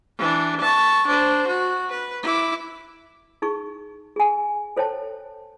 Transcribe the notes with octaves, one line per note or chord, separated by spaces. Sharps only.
E3 D4
A5 C#6
D4 C5
F#4
B4
E4 D6
D#4 G#4 C#6
G#4 G#5
A4 C5 C#5 G5 A5